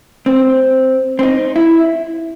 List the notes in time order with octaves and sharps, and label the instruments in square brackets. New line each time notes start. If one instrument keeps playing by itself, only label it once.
[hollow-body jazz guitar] C4
C4
D#4
E4